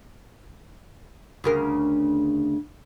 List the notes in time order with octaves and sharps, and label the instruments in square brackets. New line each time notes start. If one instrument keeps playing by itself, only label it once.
[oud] D2 C#3 A#4